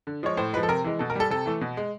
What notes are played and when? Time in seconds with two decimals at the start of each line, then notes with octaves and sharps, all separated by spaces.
0.07 D3
0.23 F3 G#3 C#5
0.37 A2 C5
0.53 G#3 B4
0.57 F3
0.63 A4
0.68 C3 A#4
0.84 E3 G#3
0.99 B2 A4
1.10 A#4
1.15 G3 A4
1.30 C3 A4
1.46 E3 A3
1.61 B2
1.77 G#3